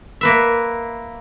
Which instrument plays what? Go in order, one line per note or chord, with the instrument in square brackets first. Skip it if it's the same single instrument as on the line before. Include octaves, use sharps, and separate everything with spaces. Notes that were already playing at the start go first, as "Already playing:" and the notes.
[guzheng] A#3 B4 E5